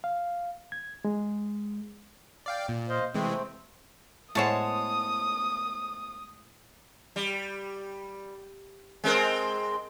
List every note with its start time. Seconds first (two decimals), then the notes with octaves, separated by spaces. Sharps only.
0.04 F5
0.72 G#6
1.05 G#3
2.46 D5 F5 G5
2.69 A#2
2.89 C5 D#5 F5
3.14 C3 E3 G#3 A3 C4
4.35 A2 G#3 B3 C5 C#5 A5 D#6
7.16 G3
9.04 G#3 C4 A#4